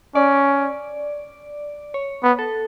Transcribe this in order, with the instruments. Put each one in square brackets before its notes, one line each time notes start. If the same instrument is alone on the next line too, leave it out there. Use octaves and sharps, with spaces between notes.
[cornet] C#4 [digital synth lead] D5
[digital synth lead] C#5
[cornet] B3
[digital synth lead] A4